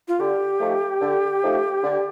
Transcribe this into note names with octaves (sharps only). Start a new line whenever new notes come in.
F4
D3 G4
F3 A3 D#4
D3
F3 A3 D#4
D3